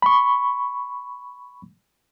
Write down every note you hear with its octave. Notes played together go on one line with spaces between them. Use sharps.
B5 C#6